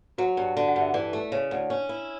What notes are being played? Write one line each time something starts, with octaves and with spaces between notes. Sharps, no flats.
F#3 F#4
G2
D3
F#5
G2
E5
E3 D5
A3
C#3 C#5
D2
C#4 C#5
E4